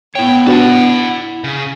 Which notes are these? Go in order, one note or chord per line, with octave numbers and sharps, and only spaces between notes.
B3 E4 C#5 G5
D4 F#4 B4 F#5 A5
C#3